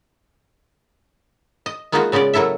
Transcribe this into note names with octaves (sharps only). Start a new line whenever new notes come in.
D#5
G#3 A#3 B3 D#4 F4 F#4
C#3 G#3 B3 C#4 D5
F#3 A#3 E4 A4 E5